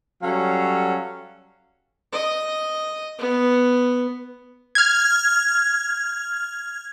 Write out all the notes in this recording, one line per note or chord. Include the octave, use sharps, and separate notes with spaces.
F#3 G3 C#4 A4 F5
D#5
B3
F6 G#6